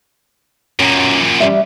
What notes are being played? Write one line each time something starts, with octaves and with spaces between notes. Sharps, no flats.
F#2 A#2 C#4
G3 E5